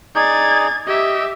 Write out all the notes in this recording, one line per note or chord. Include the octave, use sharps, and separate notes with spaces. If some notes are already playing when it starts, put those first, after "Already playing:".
D#4 G#4 D5 G#6 A6
G4 D#5 E5